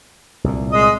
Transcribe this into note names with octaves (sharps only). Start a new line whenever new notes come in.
C2 A#2
G#3 D#5